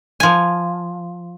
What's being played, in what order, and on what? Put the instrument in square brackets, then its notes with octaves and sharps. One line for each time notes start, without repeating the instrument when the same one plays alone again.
[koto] F3 G#5